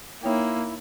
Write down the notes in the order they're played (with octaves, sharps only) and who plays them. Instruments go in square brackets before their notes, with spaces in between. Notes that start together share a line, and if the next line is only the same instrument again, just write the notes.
[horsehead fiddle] A#3 [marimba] D#4 C#5 G5 [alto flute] E4